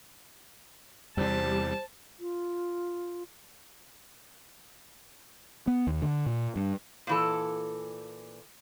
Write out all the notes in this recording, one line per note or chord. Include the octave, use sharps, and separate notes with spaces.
E2 C3 G3 C5 A5
F4
B3
D#2
D3
A#2
G2
A#2 E3 A4